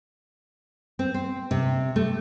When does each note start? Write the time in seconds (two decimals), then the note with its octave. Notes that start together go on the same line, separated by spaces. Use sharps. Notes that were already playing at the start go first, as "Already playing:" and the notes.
0.99 C4
1.14 C4
1.51 C3
1.96 A3